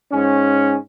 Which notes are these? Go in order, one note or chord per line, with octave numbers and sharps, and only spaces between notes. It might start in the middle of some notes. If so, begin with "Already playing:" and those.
G#2 C#4